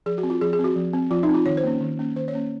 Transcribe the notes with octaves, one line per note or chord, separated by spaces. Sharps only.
F3 G#4
F#4
C4
F4
F3 G#4
G#4
C4
F#4
F3
C4
F3 F4
D#4
C4
F4
D#3 C#5
C5
A#3 C#4
D#3
A#3 C#4
D#3 C5
C#5
A#3 C#4